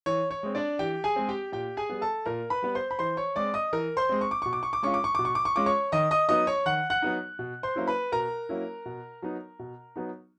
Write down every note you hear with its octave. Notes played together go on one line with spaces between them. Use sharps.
E3 C#5
C#5
G#3 C4
D4 D5
E3 G4 G5
G#4 G#5
G#3 C4
G4 G5
A#2 G4 G5
G#4 G#5
G3 B3
A4 A5
A#2 A#4 A#5
B4 B5
G3 B3
C5 C6
B5
E3 C5 C6
C#5 C#6
G#3 C4 D5 D6
D#5 D#6
E3 A#4 A#5
C5 C6
G#3 C4
C#6
D6
B2 C#6
D6
C#6
D6
G#3 C#4 F4 C#6
D6
C#6
B2 D6
C#6
D6
C#6
G#3 C#4 F4 D6
C#5 C#6
D#3 D#5 D#6
D#5 D#6
F#3 B3 D#4 D#5 D#6
C#5 C#6
D#3 F#5 F#6
F#5 F#6
F#3 B3 D#4
B2
C5 C6
F#3 A#3 C#4 E4
B4 B5
B2 A#4 A#5
F#3 A#3 C#4 E4
B2
F#3 B3 D#4
B2
F#3 B3 D#4